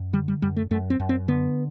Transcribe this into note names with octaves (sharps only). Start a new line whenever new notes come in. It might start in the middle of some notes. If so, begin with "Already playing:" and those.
Already playing: F#2
D3 G3
G3
F#2 G3
A3
F#2 A3
C4
F#2
C4
D3 B3